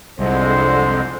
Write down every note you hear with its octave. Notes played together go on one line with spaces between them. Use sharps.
C2 F2 D3 G#3 C5